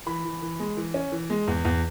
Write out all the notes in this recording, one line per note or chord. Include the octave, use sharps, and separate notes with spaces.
E3 B5
E3
E3
G#3
E3
C#4
E3
G#3
E2
E2